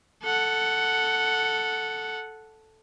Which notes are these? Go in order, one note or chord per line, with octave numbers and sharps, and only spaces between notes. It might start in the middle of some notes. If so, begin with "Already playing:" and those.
A4 F#5